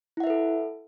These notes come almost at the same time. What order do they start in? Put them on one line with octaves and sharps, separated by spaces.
E4 F#5 E5 B4 A4